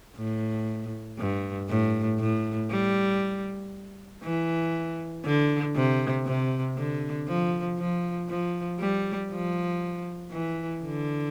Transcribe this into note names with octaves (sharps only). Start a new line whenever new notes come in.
A2
G2
A2
A2
G3
E3
D3
C3
C3
D3
F3
F3
F3
G3
F3
E3
D3